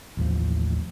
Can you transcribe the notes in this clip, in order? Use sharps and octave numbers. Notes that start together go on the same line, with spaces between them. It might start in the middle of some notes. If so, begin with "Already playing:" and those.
A1 D#2 A2 F3